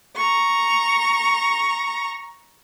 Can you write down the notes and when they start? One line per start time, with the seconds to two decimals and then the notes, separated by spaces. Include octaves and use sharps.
0.16 A#5 C#6